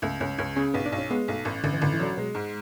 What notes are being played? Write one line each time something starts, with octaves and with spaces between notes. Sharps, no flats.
C#2 A3
C#2 C#4
C#2 C#4
C#3 C#4
B1 B3
D4
B1
C#4
G#3 B3
B1 A3
A1 C#4
A1 D3
E3
A1 D3
E3
D3 F#3
B2 G#3
G#2